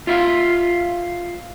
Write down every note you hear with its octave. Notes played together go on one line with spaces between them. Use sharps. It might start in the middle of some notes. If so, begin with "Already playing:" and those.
F4 E5 F5